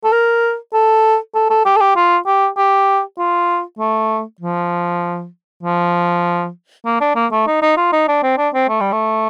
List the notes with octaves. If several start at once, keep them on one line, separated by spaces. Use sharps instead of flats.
A4
A#4
A4
A4
A4
G4
A4
G4
F4
G4
G4
F4
A3
F3
F3
A#3
D4
A#3
A3
D#4
D#4
F4
D#4
D4
C4
D4
C4
A3
G3
A3